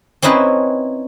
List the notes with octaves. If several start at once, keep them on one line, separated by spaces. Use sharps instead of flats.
C4 C#4 D#4 E4 B4 C5